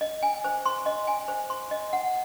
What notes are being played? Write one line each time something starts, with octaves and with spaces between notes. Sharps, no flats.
D#5
G#5
C5
C6
D#5
G#5
C5
C6
D#5
F#5